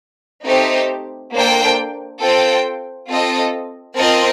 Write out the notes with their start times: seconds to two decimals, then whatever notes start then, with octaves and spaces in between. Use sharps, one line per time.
0.47 A3 C4 D#4 G4 C5
1.34 A#3 D4 A4 C5 G5
2.21 C4 F4 A4 C5 G5
3.08 C4 F4 A4 D#5
3.96 C4 F4 A#4 D#5 A5